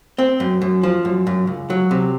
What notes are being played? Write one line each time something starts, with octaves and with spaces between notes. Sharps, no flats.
C4
F#2
F#2
F3
F#2
F#2
C#2
F#3
C3